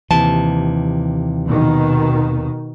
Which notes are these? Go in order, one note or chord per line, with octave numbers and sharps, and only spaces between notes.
D#2 C3 E3 A5
B2 D#3